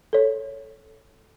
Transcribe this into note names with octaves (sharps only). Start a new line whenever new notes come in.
A4 C#5